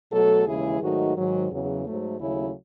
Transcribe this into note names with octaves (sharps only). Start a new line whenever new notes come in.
B2 F#3 A3 F#4 A4
D#2 C#3 E3 G#3 E4 G#4
G#2 D#3 F#3 A3 D#4 F#4
G#2 D#3 F#3
E2 C#3 F#3
G#2 F#3 A3
D#2 C#3 F#3 A3 C#4 E4